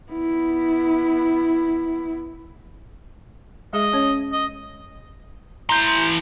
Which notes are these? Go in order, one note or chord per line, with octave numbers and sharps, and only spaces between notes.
B3 E4
G#3 G#4 D#5 E5
C#4 C#5
D#5
E3 A#5 C6 G6